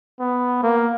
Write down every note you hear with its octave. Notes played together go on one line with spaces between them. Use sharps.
B3
A#3